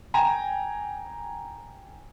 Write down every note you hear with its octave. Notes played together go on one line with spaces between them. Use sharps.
G5 G#5 A#5